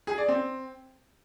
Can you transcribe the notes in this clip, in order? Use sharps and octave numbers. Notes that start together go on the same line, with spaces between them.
G#4
D5
C4